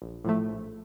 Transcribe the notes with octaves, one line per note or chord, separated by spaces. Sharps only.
A#1
A2 F3 A3
A#1